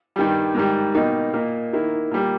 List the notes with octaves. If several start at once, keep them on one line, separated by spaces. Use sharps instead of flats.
G2 D#3 G3
G#2 D#3 G3
B2 G3 A#3 D#4
A#2 A#3 D#4
D#3 A#3 E4
A#2 G3 A#3